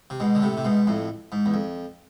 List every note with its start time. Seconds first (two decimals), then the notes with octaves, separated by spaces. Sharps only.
0.10 C3
0.20 G#2 B2
0.35 D3
0.42 A2 C3
0.57 C3
0.65 G#2 B2
0.87 F2 A2
1.32 G#2
1.46 E2
1.54 F2